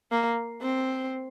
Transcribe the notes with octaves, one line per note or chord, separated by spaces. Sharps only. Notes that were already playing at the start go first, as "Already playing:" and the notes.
A#3
C4